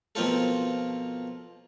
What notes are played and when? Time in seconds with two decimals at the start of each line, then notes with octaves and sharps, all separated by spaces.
0.15 B2 F3 A#3 C4 F4 A4